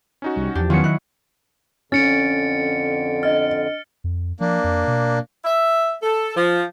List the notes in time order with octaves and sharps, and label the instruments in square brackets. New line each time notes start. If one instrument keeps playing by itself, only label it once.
[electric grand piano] C#4 D#4 F#4
[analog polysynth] C2 G3
[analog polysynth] E2 F3 [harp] D4 G4
[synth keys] D#3 C#7 [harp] F#3 [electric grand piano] B3 C#4 F4
[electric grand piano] E4 D#5 [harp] F#6
[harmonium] F2 D3 [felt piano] C#4 [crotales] A6 C#7 D7
[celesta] D4 D#5 A6 [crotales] F6
[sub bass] F2
[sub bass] F3 [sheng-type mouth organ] A#3 D4
[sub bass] F2
B2
[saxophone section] E5
A4
F3